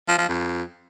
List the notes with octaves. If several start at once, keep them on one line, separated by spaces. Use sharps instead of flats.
F3
F3
F2